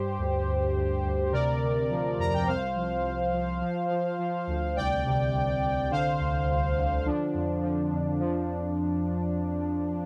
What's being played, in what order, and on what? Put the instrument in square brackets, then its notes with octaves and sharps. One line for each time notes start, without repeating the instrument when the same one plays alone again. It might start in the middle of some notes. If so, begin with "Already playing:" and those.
Already playing: [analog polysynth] G2 G4 C5
D2
D2
D2
D2
C3 A#4 D5
C3
F3
F2 A#5
G5
C2 C5 F5
F3
C2
F3
F3
F3
F3
D2
C2 D5 G5
C3
C2
C2
D3 C5 F5
D2
D2
D3
F3 D4
F2
F3
F2
F3